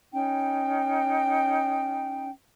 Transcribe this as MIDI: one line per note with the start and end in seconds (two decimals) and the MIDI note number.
0.13 2.29 61
0.13 2.29 63
0.13 2.29 79